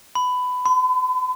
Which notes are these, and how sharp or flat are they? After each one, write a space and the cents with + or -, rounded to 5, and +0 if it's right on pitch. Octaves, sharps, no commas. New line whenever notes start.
B5 +20
B5 +45